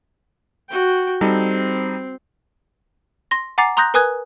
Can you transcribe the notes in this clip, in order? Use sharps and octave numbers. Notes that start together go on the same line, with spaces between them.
F#4 G5
G3 C4 D#4 A4
C6 A#6
F#5 G#5 A#5 D6 A6 C7
A#5 C6 D#6 F#6 G6 A#6
A#4 B4 G#5 D#6 F#6 G#6